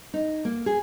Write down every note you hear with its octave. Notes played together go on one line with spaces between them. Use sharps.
D#4
A#3
G#4